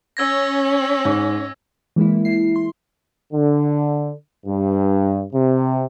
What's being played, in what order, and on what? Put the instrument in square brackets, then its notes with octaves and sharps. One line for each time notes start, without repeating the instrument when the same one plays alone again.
[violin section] C#4 [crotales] E6 G#6 A#6
[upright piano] G#2
[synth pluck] E3 G#3 A#3 E4
E4 C7
C6
[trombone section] D3
G2
C3